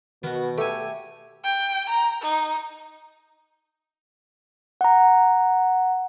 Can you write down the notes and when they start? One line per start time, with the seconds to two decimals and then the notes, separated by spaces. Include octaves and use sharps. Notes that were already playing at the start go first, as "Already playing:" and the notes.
0.24 B2 D#3 B3 F#4
0.58 A3 G4 A4 G#5
1.44 G5
1.89 A#5
2.22 D#4
4.81 F#5 A#5